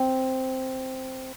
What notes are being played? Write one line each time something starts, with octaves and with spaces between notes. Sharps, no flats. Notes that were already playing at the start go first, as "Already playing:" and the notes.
Already playing: C4